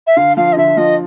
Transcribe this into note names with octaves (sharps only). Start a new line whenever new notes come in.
E5
D3 F5
F3 F5
D#5
D3 E5
F3 D#5